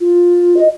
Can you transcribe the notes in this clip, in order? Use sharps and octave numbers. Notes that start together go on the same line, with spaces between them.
F4
D#5